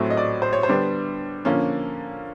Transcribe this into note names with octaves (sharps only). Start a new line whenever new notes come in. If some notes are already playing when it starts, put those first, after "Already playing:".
Already playing: A2 F#3 A3 C4
D#5
D5
C5
C#5
C5
D3 G3 B3 D4
D3 F3 A#3 C#4